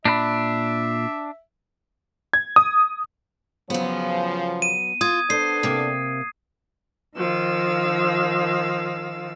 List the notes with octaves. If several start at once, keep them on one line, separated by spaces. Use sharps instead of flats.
A#2 D4 A#4 E5 B5
G#6
D#6
C#3 F3 F#3 B3
D#7
F4 D#6 G#6
B3 D4 A4 C5 C7
C3 A#3
D#3 F3 F5 E6